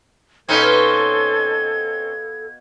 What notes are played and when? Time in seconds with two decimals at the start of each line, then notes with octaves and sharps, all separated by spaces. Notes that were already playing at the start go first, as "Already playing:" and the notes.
0.49 B2 C4 C#4 D#4 A4 B4 F5 G#6